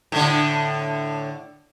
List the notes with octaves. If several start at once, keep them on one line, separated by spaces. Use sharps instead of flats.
A2 D3